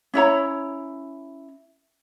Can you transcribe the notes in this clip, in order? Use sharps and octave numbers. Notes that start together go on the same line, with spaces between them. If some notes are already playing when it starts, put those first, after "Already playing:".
C#4 E4 C#5 A#5